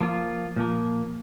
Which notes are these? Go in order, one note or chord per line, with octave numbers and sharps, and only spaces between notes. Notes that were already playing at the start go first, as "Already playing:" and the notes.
F3 A#3 F4
A#2 F3 A#3